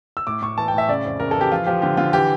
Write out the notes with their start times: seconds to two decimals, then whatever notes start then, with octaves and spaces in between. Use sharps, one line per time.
0.17 E6
0.27 A2 D6
0.42 A2 C#6
0.58 E3 A5
0.68 G5
0.74 A2 E5
0.88 C#3 D5
1.05 F2
1.20 C#3 A#4
1.31 A4
1.36 E3 G4
1.52 F3 F4
1.66 F3 G4
1.82 D3 G4
1.97 D3 F4
2.13 E3 G4